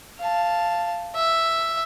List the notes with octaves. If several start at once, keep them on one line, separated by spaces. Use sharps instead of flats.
F5 A5
E5